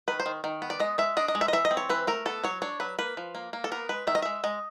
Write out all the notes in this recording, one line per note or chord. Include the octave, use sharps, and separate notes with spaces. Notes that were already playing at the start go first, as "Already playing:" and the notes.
D#3 B4
C5
D#3
D#3
B3
D5
G#3 D#5
G#3 E5
D4 D#5
D#5
G#3
E5
D#5
E3 E5
D#5
C4
C#5
E3 B4
A3 A#4
B3 A4
F#3 C#5
D4 C#5
F#3 B4
A#3 B4
F3
A#3
A#3
A4
B3 A#4
G#3 B4
D#3 E5
D#5
G#3 E5
G#3 D#5